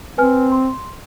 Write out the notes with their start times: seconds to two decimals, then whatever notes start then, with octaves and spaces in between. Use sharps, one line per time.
0.18 C4 B4 G#5 F6
0.52 C6